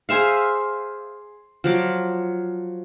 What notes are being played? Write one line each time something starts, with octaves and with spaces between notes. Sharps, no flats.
G#4 C5 E5 F5
F3 F#3 D6